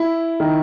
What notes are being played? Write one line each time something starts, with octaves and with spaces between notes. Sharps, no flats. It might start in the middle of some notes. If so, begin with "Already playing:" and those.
Already playing: E4
D#3